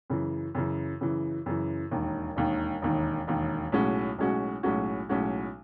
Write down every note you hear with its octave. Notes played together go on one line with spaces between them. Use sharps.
F#2 C#3 E3
F#2 C#3 E3
F#2 C#3 E3
F#2 C#3 E3
E1 D#2 D#3
E1 D#2 D#3
E1 D#2 D#3
E1 D#2 D#3
B1 A2 G#3 C#4 F#4
B1 A2 G#3 C#4 F#4
B1 A2 G#3 C#4 F#4
B1 A2 G#3 C#4 F#4